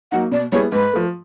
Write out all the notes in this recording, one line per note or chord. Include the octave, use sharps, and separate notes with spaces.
F#3 A#3 D#4 F#5
B2 D5
G3 B3 E4 G#4 C#5
G#2 B4
F3 A3